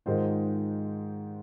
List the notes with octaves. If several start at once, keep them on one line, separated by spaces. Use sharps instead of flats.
G#2 D#3 G#3 F4 C5